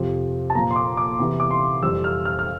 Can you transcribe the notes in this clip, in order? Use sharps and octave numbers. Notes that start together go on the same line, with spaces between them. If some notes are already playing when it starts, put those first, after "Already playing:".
Already playing: F2 C3 F3
A5
A#2 F3 A#5
C6
D6
D6
E2 C3 E3
D6
C6
F2 E3 G3 E6
F6
F6
F6